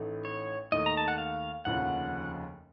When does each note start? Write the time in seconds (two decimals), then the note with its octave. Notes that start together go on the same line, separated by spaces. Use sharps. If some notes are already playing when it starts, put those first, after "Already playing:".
Already playing: A1 A2 A3 D#4
0.25 C#5
0.72 D#2 D#3 A3 D#5
0.86 A#5
0.97 A5
1.08 F#5
1.18 F5
1.65 F1 D#2 C#3 F3 F#5